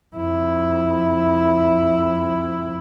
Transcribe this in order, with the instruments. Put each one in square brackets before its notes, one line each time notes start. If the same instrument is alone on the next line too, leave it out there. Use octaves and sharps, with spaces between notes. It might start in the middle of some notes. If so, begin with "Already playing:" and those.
[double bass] F2 E4